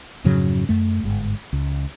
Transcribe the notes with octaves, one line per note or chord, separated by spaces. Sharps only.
F2 G#2 C#3 F#3
F#2 A3
G1 G#2
C#2